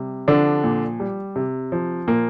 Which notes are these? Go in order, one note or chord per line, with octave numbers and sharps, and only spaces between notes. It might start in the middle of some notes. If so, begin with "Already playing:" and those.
Already playing: C3 G3
D3 F3 D4
A#2
G3
C3
F3
A#2 A#3